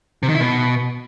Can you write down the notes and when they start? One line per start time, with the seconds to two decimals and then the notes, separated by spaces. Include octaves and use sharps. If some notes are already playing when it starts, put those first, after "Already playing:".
0.23 C3
0.29 D#3
0.35 E4
0.40 B2